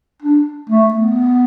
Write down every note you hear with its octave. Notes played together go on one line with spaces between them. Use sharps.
D4
A3
B3